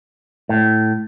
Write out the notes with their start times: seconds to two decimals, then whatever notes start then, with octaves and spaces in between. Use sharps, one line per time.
0.49 A2